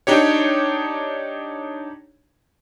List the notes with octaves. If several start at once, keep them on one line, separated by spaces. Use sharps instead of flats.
D4 D#4 G4 C#5